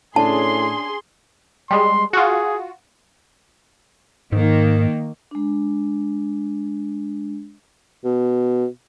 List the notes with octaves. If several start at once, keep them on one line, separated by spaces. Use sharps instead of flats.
A2 C#4 D4 G#4 A5 C6
G3 G#3 C6
F4 F#4 G#4
G#2 D#3 A#3
G#3 D4
B2